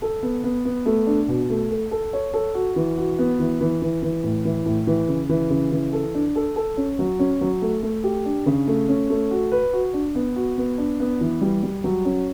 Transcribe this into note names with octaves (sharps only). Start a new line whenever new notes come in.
A4
B3
B3
B3
A3
D4
B2
A3
A4
A4
C#5
A4
F#4
E3
F#4
B3
E3
E3
E3
E3
A2
E3
A2
E3
C#3
E3
C#3
E3
A4
D4
A4
A4
C#4
F#3
C#4
F#3
A3
A3
G4
D4
C#3
A3
C#4
A3
F#4
B4
F#4
D4
B3
F#4
B3
D4
B3
E3
G3
G3
F#3
C#4